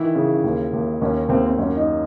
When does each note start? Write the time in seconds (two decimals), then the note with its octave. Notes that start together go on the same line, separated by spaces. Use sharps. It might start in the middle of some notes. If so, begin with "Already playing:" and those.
Already playing: D#3 E3 E4
0.15 C#3
0.44 D#2
0.73 D#2
1.01 D#2 C#4
1.29 D#2 C4
1.46 C4
1.58 F#2 C#4
1.77 D#4